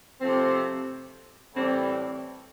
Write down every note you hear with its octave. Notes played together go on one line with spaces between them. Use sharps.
C3 F3 A3 C4
A2 E3 G3 C4